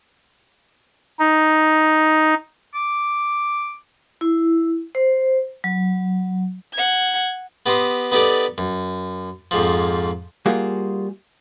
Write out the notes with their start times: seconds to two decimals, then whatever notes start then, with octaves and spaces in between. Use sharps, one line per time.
1.20 D#4
2.75 D6
4.21 E4
4.95 C5
5.64 F#3
6.74 F#5 G#6
7.66 B3 G4 D#5 C6
8.12 B3 D#4 G4 A4 D5
8.58 F#2
9.51 F2 G#2 F3
10.46 G3 A#3 F4 F#4 G#4